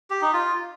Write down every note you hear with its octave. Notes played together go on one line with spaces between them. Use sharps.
G4
D#4
F4